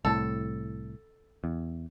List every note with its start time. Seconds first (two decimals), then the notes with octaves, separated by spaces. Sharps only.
0.05 C2 A2 A4
1.44 E2